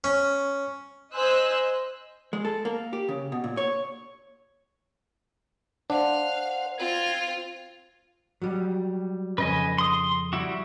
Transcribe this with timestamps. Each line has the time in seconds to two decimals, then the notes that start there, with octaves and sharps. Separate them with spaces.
0.04 C#4
1.12 C5 D#5 G#5 E6 F#6
2.33 G#3
2.45 A4
2.65 A#3
2.93 G4
3.09 C#3
3.32 B2
3.44 A#2
3.57 C#5
5.90 D4 C5 F5 F#5
6.78 C4 F4 G#6
8.42 F#3 G3
9.38 F2 C#3 B4 D#5 G#5
9.78 C6 D#6
10.33 G3 E4 F#4